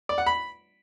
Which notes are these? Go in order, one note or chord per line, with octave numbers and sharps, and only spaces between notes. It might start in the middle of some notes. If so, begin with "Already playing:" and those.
D5
F#5
B5